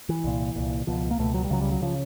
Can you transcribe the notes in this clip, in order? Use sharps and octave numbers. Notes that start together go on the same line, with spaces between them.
E3
C2 A#2
C2 A#2
C#2 B2 F3
A#3
C#2 B2 A3
F#3
G3
C#2 C#3 F#3
G3
F#3
C#3 F3